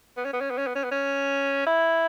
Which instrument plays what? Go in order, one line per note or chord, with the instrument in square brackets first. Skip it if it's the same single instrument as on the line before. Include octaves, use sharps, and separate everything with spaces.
[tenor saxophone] B3
C#4
B3
C#4
B3
C#4
B3
C#4
B3
C#4
E4